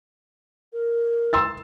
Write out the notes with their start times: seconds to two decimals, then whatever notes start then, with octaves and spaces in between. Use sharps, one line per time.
0.73 A#4
1.33 C6 E6 A6